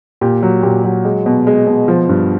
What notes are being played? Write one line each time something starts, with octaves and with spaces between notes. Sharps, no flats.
A#2 G4
F#3
A#2 G4
F#3 F#4
G#3
B2
G#3
B2
F3
G2